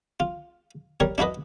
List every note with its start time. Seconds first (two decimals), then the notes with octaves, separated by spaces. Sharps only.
0.20 F4
1.00 G3 A#4 C#5
1.18 D4 E4 F#4 B4 D#5